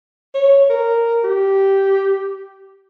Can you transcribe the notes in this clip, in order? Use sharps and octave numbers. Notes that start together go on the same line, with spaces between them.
C#5
A#4
G4